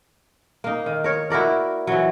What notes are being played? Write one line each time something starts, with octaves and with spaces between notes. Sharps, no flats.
A#3 D#4
D#3
A#4 C#5
E4 F#4 A#4 D5
E3 F#3